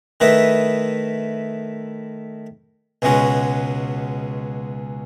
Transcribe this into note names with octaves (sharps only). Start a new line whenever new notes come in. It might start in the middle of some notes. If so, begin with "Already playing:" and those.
D#3 A3 E4 B4 D#5
C#2 B2 G#3 C#4 F#4